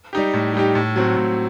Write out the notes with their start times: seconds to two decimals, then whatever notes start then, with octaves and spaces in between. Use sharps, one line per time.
0.13 G3 D#4 G4
0.34 A2
0.54 G3 D#4 G4
0.75 A2
0.96 F#3 C4 F#4
1.17 A2